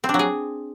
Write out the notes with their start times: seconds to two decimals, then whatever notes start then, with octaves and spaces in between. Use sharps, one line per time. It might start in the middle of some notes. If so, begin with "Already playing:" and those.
0.04 C4
0.09 D4
0.14 F#3
0.19 G#4